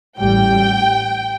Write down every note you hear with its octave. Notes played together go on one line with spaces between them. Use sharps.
A1 A2 G3 G5